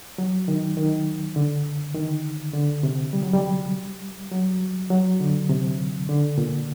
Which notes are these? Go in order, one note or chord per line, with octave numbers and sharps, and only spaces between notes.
F#3
D#3
D#3
D3
D#3
D3
C3
G3
F#3
G3
F#3
F#3
D3
C3
D3
A#2